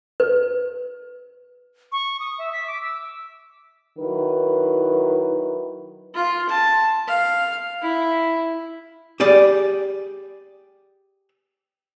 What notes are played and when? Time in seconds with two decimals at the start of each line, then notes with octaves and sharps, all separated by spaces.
0.20 B4
1.92 C#6
2.20 D#6
2.39 E5
2.53 B6
2.67 D6
2.82 E6
3.98 D#3 F#3 E4 B4
6.15 F4
6.49 A5
7.08 F5
7.82 E4
9.20 G4 G#4 D5